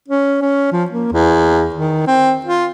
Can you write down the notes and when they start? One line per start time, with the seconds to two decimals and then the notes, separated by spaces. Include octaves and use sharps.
0.09 C#4
0.42 C#4
0.72 F3
0.91 A#3
1.13 E2
1.75 D#3
2.07 C4
2.45 F4